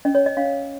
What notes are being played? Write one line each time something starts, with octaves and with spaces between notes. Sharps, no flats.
C#4 D#5
C#5
D#5
C#4 F5